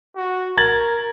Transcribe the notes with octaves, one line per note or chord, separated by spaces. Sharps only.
F#4
A#4 G#6 A6 F#7